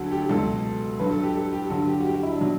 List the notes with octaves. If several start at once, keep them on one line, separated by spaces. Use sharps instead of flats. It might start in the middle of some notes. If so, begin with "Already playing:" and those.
Already playing: D2 D3 F#3 F#4 A4
G4
C#2 B2 F#3 A4
G2 F#3 B4
A4
G4
A4
G4
G2 D3 F#3 F#4
G4
F#4
G4
F#4
E4
D4
B2 F#3